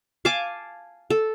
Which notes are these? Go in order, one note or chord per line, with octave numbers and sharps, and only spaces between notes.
F5 G#5 A5 D6
A4